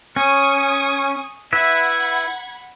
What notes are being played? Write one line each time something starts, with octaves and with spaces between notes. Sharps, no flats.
C#4 G#5 C#6 D#6
E4 B4 E5 F#5 B5 G#6